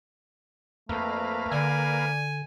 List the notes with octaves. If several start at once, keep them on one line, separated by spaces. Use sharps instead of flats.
F2 A3 A#3 B4 F5
D3 D5 G#5